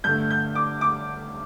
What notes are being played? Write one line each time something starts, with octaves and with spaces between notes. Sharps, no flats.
G2 D3 A3 G6
G6
D6
D6